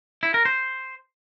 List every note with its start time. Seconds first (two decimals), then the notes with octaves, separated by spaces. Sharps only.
0.23 E4
0.34 A#4
0.45 C5